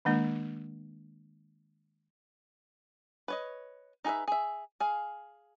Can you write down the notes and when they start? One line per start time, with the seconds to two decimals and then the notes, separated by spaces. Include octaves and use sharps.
0.05 D#3 G#3 A#3 D4
3.28 B4 C#5 D#5
4.05 D#4 G#4 A#4 B4 E5
4.28 G#4 E5
4.80 G#4 F5